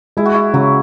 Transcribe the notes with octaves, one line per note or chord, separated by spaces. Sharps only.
G#3 E4
F#4
E4
C#3 F#3